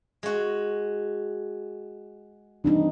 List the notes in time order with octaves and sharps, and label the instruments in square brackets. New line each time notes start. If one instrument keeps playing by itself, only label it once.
[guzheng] G#3 F#4
[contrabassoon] G2 [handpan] E3 C4 D#4